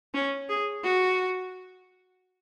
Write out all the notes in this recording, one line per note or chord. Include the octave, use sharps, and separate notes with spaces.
C#4
G#4
F#4